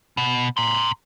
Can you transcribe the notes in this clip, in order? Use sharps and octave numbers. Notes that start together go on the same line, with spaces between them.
B2
A#5 C6